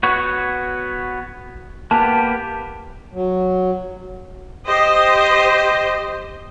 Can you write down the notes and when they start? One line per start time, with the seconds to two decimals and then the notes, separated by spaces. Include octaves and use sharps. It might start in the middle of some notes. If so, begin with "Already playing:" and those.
0.03 B3 F#4 C#5
1.91 A#3 B3 G4 A5
3.13 F#3
4.65 G4 C5 D#5